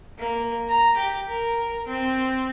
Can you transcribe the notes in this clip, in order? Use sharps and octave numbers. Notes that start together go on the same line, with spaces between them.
A#3
A#5
G4
A#4
C4